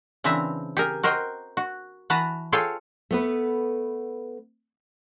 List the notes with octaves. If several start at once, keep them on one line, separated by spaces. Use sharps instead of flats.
C#3 E3 C4 D4 E5 A#5
G4 G#4 A#4
F#4 A#4 C5 D#5 G5
F#4
E3 F#4 B4 F#5 A5 A#5
F4 G#4 A4 C#5 F5 G5
A3 B3 B4